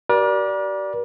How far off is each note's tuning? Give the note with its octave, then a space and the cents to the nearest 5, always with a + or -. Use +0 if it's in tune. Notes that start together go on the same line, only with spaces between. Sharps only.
G4 -45 A#4 +45 D5 -5